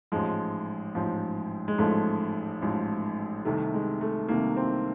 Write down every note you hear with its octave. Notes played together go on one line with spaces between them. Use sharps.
A1 G#2 F3 G#3
A1 G#2 F3
G#3
A1 G#2 F3 A3
A1 G#2 F3
C2 C3 D#3 A3
G#3
A3
C2 C3 D#3 A#3
C4